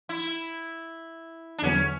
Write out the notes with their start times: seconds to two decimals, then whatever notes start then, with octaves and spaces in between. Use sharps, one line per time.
0.09 E4
1.58 D4
1.62 E2 D3 F#3 B3 C#4